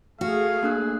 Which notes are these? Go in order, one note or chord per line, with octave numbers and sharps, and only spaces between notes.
A3 F#4 G#4 F5
A#3 D4 F#6